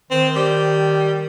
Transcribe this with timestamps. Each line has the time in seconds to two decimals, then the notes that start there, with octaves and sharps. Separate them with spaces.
0.11 D#3 C4
0.36 G3